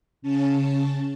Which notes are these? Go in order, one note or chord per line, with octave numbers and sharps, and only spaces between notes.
C#3 C#4 A5